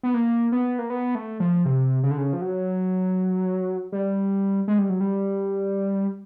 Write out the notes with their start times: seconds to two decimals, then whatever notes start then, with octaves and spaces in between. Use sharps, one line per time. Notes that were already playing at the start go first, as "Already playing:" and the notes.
0.03 B3
0.14 A#3
0.52 B3
0.79 A#3
0.90 B3
1.15 A3
1.40 F3
1.65 C3
2.03 C#3
2.11 D3
2.18 C#3
2.33 F3
2.41 F#3
3.92 G3
4.68 G#3
4.79 G3
4.90 F#3
5.01 G3